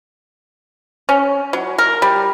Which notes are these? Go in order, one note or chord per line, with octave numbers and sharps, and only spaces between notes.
C#4
F#3
A#4
G3